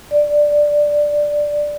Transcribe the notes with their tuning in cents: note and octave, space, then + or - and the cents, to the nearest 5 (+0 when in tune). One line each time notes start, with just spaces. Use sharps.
D5 +5